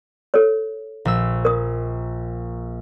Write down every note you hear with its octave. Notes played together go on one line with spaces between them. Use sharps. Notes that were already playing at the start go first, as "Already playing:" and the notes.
A4 C#5
A#1 E6
A#4 D#6